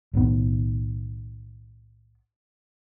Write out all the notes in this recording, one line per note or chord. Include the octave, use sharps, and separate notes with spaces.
B1 A2 D#3 B3